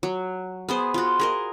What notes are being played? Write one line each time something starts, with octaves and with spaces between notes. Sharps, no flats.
F#3
B3 G#4 C5
F4 F#4
G#4 A#4 D#5